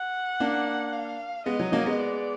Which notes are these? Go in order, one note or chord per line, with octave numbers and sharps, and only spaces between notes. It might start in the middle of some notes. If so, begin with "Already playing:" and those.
Already playing: F#5
A#3 D4
F5
G#3 B3 D#5
F#3
F#3 A#3
G#3 B3
D5